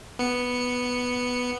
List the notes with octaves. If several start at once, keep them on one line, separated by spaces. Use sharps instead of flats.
B3 C#7